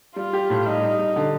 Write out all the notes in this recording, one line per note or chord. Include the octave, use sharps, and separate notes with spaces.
G3 F4
G4
A2
G3 D#4
G3
G3
D3